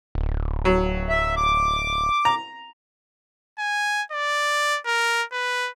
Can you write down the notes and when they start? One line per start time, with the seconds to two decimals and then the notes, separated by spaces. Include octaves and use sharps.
0.15 D1
0.65 F#3
1.09 E5
1.37 D6
2.25 A#5
3.59 G#5
4.12 D5
4.86 A#4
5.33 B4